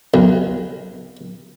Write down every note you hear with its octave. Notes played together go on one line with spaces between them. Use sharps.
B1